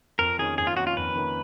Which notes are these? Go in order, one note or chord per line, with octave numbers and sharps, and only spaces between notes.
F2 A#4
D#3 A#3 C#4 G#4
F2 G#4
F4
D#3 A#3 C#4 F#4
F4
F2 B4
D#3 A#3 C#4